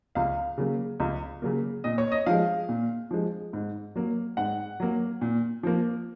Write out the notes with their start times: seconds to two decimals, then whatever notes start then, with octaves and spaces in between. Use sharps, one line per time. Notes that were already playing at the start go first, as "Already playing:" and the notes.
0.15 C#2 F5
0.58 C#3 F#3 A#3
1.00 C#2
1.42 C#3 F#3 A#3
1.84 A#2 D#5
1.98 C#5
2.12 D#5
2.26 F3 G#3 F5
2.69 A#2
3.11 F3 G#3
3.53 G#2
3.95 F#3 A#3
4.37 G#2 F#5
4.80 F#3 A#3
5.21 A#2
5.63 F3 A#3